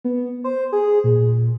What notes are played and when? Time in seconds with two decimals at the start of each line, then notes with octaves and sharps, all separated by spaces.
0.05 B3
0.44 C5
0.72 G#4
1.04 A#2